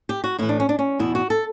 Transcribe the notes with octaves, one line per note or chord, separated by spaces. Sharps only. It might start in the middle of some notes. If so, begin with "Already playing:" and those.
G4
F#4
A2 E3 E4
D4
C#4
D4
C#4
E2 B2 E4
F#4
A4